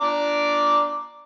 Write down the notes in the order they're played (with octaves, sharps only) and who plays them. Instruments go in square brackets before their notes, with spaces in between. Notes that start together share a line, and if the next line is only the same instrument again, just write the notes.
[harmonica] D4 A#5 D6